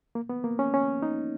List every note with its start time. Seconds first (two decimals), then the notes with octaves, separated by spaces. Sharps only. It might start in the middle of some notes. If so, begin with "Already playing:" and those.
0.15 A#3
0.29 B3
0.44 A#3
0.59 C#4
0.74 C#4
1.02 D#4